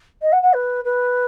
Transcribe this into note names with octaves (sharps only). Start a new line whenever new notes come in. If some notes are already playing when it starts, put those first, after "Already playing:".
D#5
F#5
F#5
B4
B4